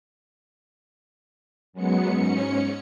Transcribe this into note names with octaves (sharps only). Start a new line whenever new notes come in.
F#2 F#3 G#3 B3 C#7
G#2 C#4 C#7